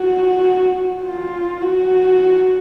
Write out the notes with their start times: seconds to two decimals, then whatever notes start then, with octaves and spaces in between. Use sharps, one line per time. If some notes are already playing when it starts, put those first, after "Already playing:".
Already playing: F#4
1.05 F4
1.61 F#4